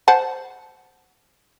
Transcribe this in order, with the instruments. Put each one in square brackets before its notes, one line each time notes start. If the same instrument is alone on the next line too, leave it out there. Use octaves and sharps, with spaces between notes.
[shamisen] C5 F#5 A5